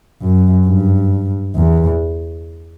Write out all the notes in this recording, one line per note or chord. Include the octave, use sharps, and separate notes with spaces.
F#2
G2
E2